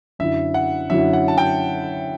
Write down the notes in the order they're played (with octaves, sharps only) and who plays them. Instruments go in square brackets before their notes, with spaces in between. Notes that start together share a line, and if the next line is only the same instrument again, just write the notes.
[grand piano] F#2 D3 F#3 C#4 E4 [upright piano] E5
[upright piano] F#5
[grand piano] F#2 D3 F#3 C#4 E4 [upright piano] E5
[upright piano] F#5
A5
G5